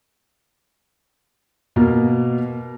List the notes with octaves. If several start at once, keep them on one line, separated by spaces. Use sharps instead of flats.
B2 A#3 A#4